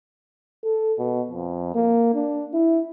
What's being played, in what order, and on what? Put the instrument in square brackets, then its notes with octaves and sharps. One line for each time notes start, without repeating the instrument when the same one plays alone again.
[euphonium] A4
B2
F2
A#3
D4
E4